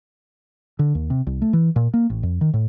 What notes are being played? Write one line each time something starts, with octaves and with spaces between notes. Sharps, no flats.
D3
D#2
C3
C2
A3
E3
A#2
A#3
A1
F2
D#3
A2